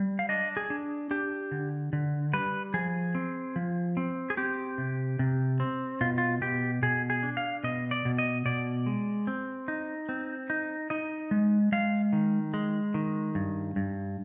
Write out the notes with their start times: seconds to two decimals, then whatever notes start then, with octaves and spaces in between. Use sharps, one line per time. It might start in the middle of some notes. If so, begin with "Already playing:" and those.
Already playing: G3
0.19 F5
0.29 D4 D#5
0.57 G#4
0.70 D4
1.11 D4 G4
1.51 D3
1.93 D3
2.33 G3 B4
2.74 F3 G#4
3.15 C4
3.56 F3
3.97 C4
4.30 G#4
4.37 C4 G4
4.78 C3
5.19 C3
5.60 C4
6.01 B2 F4
6.18 F4
6.41 B2 G4
6.83 B2 G#4
7.10 G#4
7.23 D4
7.37 F5
7.64 B2 D#5
7.91 D5
8.05 B2
8.19 D#5
8.46 B2 D5
8.86 G#3
9.27 C4
9.68 D#4
10.09 C4
10.50 D#4
10.90 D#4 D#5
11.31 G#3
11.72 G#3 F5
12.13 D#3
12.54 G#3
12.94 D#3
13.35 G2
13.76 G2